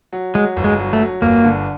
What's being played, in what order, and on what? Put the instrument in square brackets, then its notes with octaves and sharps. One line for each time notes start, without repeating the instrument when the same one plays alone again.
[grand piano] F#3
[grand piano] F#3 [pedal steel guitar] G#3
[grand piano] G1
[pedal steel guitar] G#3
[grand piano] F#3
[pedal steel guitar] A3
[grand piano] F#3
[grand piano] G1 [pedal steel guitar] A#3
[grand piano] D3